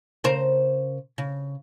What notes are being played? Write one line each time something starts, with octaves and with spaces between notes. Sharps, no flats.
C#3 A#4 C5
C#3